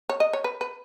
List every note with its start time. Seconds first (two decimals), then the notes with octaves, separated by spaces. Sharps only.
0.09 C#5
0.20 D#5
0.33 C#5
0.44 B4
0.61 B4